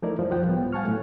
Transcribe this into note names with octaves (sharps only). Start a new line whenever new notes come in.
F3 A3 D#4 E4 A#4 D5
F2 F3 G#3
C#2 F3 F4 F#5 G5
A2 G3 B3
F5 F#5 G#5 A5 C#6 F6
A2 F#3 A3